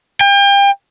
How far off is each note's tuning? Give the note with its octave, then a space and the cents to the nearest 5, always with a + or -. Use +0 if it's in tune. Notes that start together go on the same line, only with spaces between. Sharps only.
G5 +35